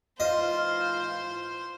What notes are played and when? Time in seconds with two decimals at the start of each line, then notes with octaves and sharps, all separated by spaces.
0.20 G#2 E3 F4 C5 D#5